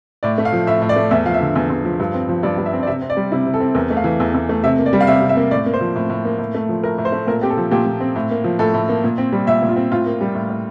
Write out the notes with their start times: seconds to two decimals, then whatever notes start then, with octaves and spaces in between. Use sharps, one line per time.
0.23 A2 D5
0.38 A3
0.45 F5
0.53 F3
0.67 A2 E5
0.82 A2
0.89 D5
0.96 A3
1.11 E2 E5
1.25 F3 F5
1.34 E5
1.41 D3
1.55 E2
1.70 E2
1.85 F3
2.00 G2
2.14 C4
2.29 F3
2.43 G2 D5
2.58 G2
2.66 E5
2.73 C4
2.83 D5
2.87 C3 E5
3.02 C4
3.10 D5
3.17 G3
3.32 C3 E4
3.46 C3
3.54 A4
3.60 C4
3.75 E2 A#4
3.90 A3
3.97 F5
4.04 E3
4.20 E2
4.34 E2
4.49 A3
4.64 C3 E5
4.79 A#3
4.86 D5
4.93 G3
5.01 F5
5.07 C3 E5
5.22 C3
5.29 E5
5.37 A#3
5.51 A2 D5
5.66 A#3
5.74 C5
5.81 F3
5.96 A2
6.10 A2
6.25 A#3
6.39 A2
6.55 A3
6.69 F3
6.84 A2 A#4
6.98 A2
7.05 C5
7.12 A3
7.27 A#2 A#4
7.41 C4 G4
7.50 A4
7.57 F3
7.71 A#2 G4
7.86 A#2
8.00 C4
8.16 A2
8.31 A#3
8.44 F3
8.59 A2 A4
8.74 A2
8.89 A#3
9.04 A#2
9.18 C4
9.32 G3
9.47 A#2 E5
9.62 A#2
9.69 F4
9.76 C4
9.92 A2 F4
10.06 A#3
10.21 G3
10.35 A2
10.50 A2